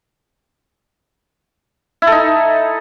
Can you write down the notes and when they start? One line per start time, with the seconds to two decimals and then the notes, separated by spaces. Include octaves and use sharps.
2.02 E4
2.07 A4
2.12 D#4